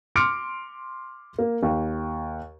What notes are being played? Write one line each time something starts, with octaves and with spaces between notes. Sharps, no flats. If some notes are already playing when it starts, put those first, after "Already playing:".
C6 D6 F6 C#7 D7
A#3
D#2